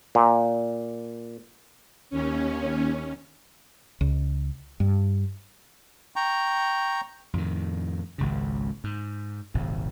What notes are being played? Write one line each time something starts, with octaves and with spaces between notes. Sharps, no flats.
A#2
D#2 C#4
C#2
G2
G5 A#5 C#6
F2 A2 D3 D#3
G#1 C#2 C#3
G#2
D#1 G#1 C3